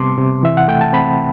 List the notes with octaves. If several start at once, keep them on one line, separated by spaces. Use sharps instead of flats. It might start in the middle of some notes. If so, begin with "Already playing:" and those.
Already playing: C3 G3 B3 A5 C6 D6
C3
E3 E5
F#5
A3 G5
A5
C4 B5